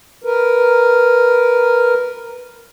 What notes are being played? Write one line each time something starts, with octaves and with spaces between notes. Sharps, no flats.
A#4 B4